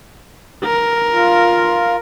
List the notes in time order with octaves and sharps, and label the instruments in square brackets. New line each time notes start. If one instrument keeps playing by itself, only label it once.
[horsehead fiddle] A#4
[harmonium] F4